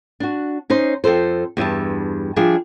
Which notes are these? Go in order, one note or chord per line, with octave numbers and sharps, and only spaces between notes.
D4 F#4
C#4 D#4 C5
F2 B2 A4 C5
E2 G2 E5 A5
F3 G3 D4 G#4 E5